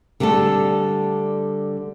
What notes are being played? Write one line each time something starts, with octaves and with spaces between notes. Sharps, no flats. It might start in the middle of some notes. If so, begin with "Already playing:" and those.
D3 G3 A3 D4 A4